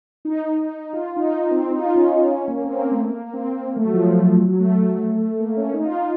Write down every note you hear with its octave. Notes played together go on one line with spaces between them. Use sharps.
D#4
F4
D#4
D#4
C4
C4
D#4
F4
D#4
C#4
C#4
A#3
C4
A#3
A3
A#3
C4
A#3
A3
F#3
F3
F#3
F#3
F#3
A3
A#3
C#4
D#4
F4
D#4